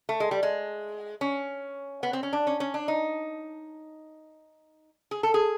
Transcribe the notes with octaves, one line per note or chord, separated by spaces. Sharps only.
A3
G#3
G3
G#3
C#4
B3
C4
C#4
D4
C#4
C#4
D4
D#4
G#4
A4
G#4